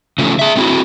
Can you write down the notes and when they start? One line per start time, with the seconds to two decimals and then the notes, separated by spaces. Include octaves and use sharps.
0.18 C#3 F3 A3
0.39 G#4 E5
0.56 A3 C4 E4 F#4